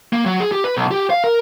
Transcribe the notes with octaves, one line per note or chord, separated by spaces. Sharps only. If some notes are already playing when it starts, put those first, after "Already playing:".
A#3
F#3
G#4
G4
B4
B1
G4
F5
A#4